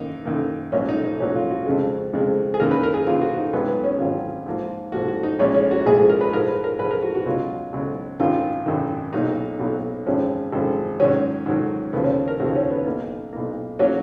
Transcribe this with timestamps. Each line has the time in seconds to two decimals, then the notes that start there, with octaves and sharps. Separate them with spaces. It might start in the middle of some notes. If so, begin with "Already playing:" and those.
Already playing: F#2 D#3 A#3 D#4
0.25 F#2 D#3 A#3
0.72 A#1 G#2 F#3 A#3 C#4
0.89 D#4
1.04 D#4
1.20 A#1 G#2 F#3 A#3 C#4
1.35 F4
1.50 F#4
1.66 F2 C#3 G#3
2.13 F2 C#3 G#3
2.54 G#4
2.60 F#2 D#3 A#3 A#4
2.71 B4
2.83 A#4
2.94 G#4
3.07 F#2 D#3 A#3 F4
3.21 F#4
3.38 D#4
3.53 G#1 G#2 D#3 F#3 B3
3.68 B3
3.84 C#4
3.99 G#1 G#2 D#3 F#3 F4
4.46 G#2 F3 A#3
4.92 G#2 F3 A#3 F#4
5.08 F#4
5.23 D#4
5.39 A#1 A#2 G#3 C#4
5.54 C#4
5.71 F#4
5.86 A#1 A#2 G#3 G#4
5.98 G#4
6.09 A#4
6.21 B4
6.32 G#2 F3 G#3 A#4
6.48 B4
6.64 A#4
6.79 G#2 F3 G#3 B4
6.91 A#4
7.02 F#4
7.15 F#4
7.25 C#2 B2 F#3 F4
7.73 C#2 B2 F#3
8.20 G#1 F#2 D#3 F4
8.66 G#1 F#2 D#3
9.13 B1 B2 F#3 A#3 D#4
9.59 B1 B2 F#3 A#3
10.06 G#1 F#2 F3 G#3 C#4
10.53 G#1 F#2 F3 G#3
11.00 G#2 D#3 F#3 C#4
11.46 G#2 D#3 F#3
11.93 D#2 C#3 F3 B3
12.04 C#4
12.28 A#4
12.40 D#2 C#3 F3 F#4
12.50 D#4
12.56 C#4
12.71 B3
12.86 B1 B2 A#3
13.33 B1 B2 A#3
13.79 F#3 A#3 C#4